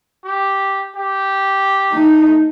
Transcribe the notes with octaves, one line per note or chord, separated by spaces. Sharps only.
G4
G4
A3 D#4